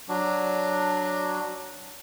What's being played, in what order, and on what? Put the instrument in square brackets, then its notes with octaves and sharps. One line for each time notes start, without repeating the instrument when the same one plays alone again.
[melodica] F#3 D4